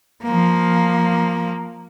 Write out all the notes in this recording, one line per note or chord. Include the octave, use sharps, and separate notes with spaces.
F3 A#3